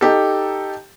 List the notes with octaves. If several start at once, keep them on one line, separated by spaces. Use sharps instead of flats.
D#4 G4 A4